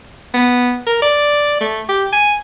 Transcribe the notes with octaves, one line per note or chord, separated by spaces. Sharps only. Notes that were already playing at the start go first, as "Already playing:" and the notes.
B3
A#4
D5
A3
G4
G#5